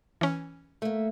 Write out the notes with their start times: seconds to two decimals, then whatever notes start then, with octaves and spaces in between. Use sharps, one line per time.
0.21 E3 C#4
0.82 A3 A#3